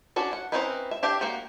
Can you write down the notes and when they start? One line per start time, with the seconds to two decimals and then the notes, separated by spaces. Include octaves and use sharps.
0.16 C#4 D4 F#4
0.33 F#5
0.52 C4 C#4 D#4 E4 B4
0.91 E5
1.03 D4 G4 E5 G5
1.21 A#3 F#4 G5